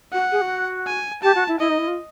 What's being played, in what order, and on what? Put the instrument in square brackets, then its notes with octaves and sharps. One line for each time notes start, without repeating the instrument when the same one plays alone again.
[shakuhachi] F#4 [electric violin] F#5
[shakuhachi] G#4
F#4
[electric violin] G#5
[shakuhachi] G4 [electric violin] A5
[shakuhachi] F#4
E4
[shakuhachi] E4 [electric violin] D#5
[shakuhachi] D#4
E4
F4